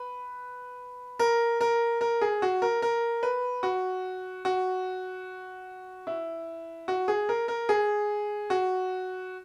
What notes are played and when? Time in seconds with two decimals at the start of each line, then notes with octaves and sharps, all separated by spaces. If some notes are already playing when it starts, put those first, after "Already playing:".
Already playing: B4
1.19 A#4
1.61 A#4
2.01 A#4
2.21 G#4
2.42 F#4
2.62 A#4
2.82 A#4
3.23 B4
3.63 F#4
4.45 F#4
6.07 E4
6.88 F#4
7.08 G#4
7.29 A#4
7.48 A#4
7.69 G#4
8.50 F#4